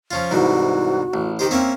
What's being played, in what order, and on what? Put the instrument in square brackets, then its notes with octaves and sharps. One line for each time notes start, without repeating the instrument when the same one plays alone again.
[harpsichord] F3 C#4 F4
[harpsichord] C2 G#2 E3 [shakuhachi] F#4
[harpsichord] A1
[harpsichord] D#3 C5 [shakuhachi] G4
[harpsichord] A#3 C#4 E5 [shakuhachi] C4